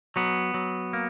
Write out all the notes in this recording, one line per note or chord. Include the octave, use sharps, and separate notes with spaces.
F#3 B3
F#3
A#3